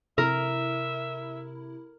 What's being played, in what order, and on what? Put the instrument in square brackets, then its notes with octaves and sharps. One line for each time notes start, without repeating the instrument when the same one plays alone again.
[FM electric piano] C3 E4 [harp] A#4 [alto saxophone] E5